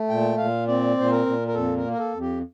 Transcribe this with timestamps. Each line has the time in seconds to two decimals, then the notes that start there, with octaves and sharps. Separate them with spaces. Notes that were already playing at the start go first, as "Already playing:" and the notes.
Already playing: A3
0.09 A#2 G5
0.38 A#2 F5
0.68 C4 D5
0.97 A#2 C5
1.11 A#4
1.26 A#2
1.48 A#4
1.54 F2 A4
1.77 A#4
1.84 A#3
1.93 A#4
1.99 A4
2.14 F2
2.21 G4